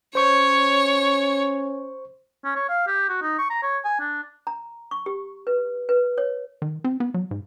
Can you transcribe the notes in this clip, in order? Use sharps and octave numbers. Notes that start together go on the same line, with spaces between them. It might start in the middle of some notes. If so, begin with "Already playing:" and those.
C#4 C5 C#5 C#6
C#4
C#5
F5
G4
F#4
D#4
C#6
A#5
C#5
G#5
D4
A#5
C#6
G4
B4
B4
C#5
D#3
C4
B3
F#3
G#2